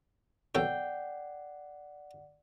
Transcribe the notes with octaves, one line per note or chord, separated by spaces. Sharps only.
B1 A4 C#5 D5 F#5 G5